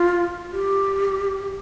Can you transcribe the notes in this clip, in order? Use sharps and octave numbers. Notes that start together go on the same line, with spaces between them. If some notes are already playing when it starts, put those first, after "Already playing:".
Already playing: F4
G4